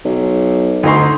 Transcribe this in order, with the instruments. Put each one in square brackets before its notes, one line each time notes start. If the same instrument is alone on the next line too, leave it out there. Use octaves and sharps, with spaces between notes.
[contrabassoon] B1
[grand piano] D2 D#4 C6